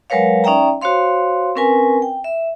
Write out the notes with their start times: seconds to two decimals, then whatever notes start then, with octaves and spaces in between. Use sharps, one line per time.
0.10 F#3 G#3 A#4 B4 C#5 F5
0.44 C#4 D#4 D5 E5 G5 A#5
0.81 F#4 C5 C#5 F5 C6
1.56 C4 C#4 A#4 B4 G#5
2.02 G5
2.24 E5